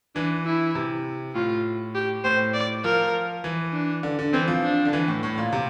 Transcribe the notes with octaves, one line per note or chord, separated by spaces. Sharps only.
E3 D4
E4
C3
A2 F4
G4
A2 C5
D5
F3 A#4
E3
D4
D3
D3
E3 C4
F3
D4
D3
E3
A2
A2
A#2
C3